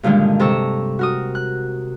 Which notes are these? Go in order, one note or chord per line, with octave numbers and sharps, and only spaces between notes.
G2 A#2 D3 D#3 G#3
C3 A4 A#5 C#6 E6
F#4 A#4 D#6
F#6